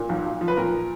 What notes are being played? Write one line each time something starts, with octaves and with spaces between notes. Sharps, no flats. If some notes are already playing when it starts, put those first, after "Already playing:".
Already playing: A#2
B1
B1
F3
B4
A#2 A#4